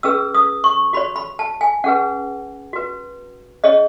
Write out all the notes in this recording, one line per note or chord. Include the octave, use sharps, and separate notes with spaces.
C#4 G#4 B4 E6
D#6
C#6
F#4 C#5 B5
B5
A5
G#5
C#4 G#4 B4 F#5
F#4 B4
C#4 G#4 C#5 D#5